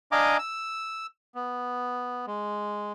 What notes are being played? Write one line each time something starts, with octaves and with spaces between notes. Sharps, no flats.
D4 D#5 F5 G#5 A#5 D6
E6
B3
G#3